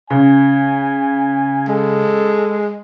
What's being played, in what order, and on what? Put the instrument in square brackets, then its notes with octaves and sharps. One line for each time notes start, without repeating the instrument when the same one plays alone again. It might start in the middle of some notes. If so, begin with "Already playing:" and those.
[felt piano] C#3 [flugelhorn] G#5
[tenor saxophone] G#3 [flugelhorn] A4